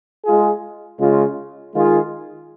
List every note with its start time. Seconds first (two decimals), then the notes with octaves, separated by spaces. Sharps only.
0.24 G#3 F4 G#4
0.99 C#3 G#3 F4
1.73 D#3 G#3 F4 G#4